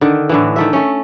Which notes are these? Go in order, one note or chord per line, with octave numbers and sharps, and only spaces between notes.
D3 D#3
A2 D3 E3
D#3 A3 E5
A3 C#4